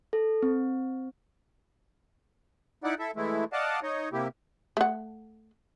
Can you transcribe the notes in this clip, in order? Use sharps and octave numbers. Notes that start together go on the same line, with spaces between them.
A4
C4
D#4 E4 D5 F#5
E4 A4 E5
E3 G#3 A3 E4
D5 D#5 F5 F#5 A5
D#4 C#5 D#5
C3 A#3 E4 G4
A3 F#5